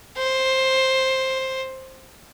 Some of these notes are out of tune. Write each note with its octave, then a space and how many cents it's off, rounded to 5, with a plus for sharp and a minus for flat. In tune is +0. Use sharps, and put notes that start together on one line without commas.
C5 +10